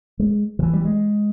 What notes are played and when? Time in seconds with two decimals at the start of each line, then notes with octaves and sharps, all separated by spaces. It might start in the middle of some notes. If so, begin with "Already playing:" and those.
0.19 G#3
0.59 D#3
0.63 E3
0.73 G3
0.85 G#3